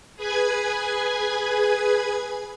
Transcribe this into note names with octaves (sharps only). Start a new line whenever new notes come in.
G#4 B4 G#5 G#6